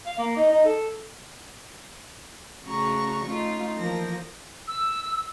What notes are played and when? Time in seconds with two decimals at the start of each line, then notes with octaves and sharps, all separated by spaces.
0.06 F5
0.18 A#3
0.36 D#4
0.51 D#4
0.65 A4
2.65 C#3 A3 F#4 A#5 C#6
3.24 A3 C#4 D#4 F4
3.76 E3 F3 A#3 A#6
4.68 E6